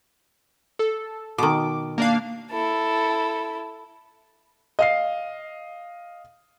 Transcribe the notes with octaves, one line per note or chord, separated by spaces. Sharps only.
A4
B2 D#3 D6
A#3 D4 F5
E4 A4
D#5 F5 C7